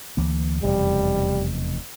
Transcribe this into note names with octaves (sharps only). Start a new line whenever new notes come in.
D2 E3 A#3
F1 E2 B2 G3